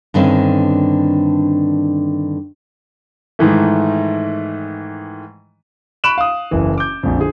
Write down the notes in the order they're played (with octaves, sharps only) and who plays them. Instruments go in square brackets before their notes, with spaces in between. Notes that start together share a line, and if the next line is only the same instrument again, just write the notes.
[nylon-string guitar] G2 D3 D#3 C4 C#4
[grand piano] G#2 D#3 E3 A3
B5 C#6 F#6 D7 E7 F#7
F5 D#6
F#1 E3
D6 G6
A#1 F2
D3 G#4